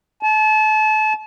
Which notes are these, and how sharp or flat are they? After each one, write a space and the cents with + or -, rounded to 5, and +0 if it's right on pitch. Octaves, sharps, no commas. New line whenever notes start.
A5 -35